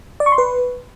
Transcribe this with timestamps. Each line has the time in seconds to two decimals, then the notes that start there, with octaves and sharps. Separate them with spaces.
0.20 D5
0.26 C#6
0.32 C6
0.38 B4